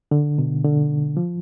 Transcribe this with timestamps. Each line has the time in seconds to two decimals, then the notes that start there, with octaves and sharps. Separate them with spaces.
0.11 D3
0.38 B2
0.65 D3
1.17 F3